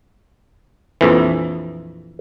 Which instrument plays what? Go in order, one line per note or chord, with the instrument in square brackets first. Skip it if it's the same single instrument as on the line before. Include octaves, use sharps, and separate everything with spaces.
[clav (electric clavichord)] A#1 F2 E3